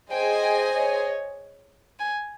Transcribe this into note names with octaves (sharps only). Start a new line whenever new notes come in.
G#4 C5 D#5 G5 G#5
G5
C#5
G#5